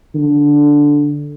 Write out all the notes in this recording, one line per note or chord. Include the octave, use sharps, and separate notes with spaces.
D3